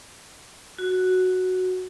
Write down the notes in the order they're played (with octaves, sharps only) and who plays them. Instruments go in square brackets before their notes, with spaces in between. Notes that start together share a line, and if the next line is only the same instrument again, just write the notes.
[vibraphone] F#4